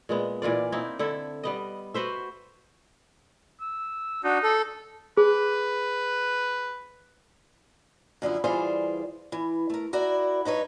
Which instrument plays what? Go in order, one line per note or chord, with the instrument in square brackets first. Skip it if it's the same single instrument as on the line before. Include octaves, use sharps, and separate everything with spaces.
[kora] A#2 G#3 B3
A#2 E3 F4 D5
A#3 C4 D#4 E4
D3 E4 A4
G3 B3 D#5
F#4 B4 C5 E5
[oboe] E6
[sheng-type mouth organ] D4 F#4 [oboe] D#4
[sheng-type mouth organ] A4
[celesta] G#4 [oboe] B4
[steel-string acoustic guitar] F#2 D3 F3 E4
E3 G3 F4 G#4 C5 D5
E3
A3 A#4
E4 F#4 A#4 D5
G2 D#4 B4 C#5